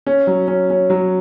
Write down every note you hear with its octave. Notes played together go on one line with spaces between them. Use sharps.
C#4
F#3
C#4
C#4
F#3